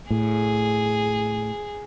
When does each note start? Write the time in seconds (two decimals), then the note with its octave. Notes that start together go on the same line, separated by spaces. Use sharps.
0.10 A2 G#4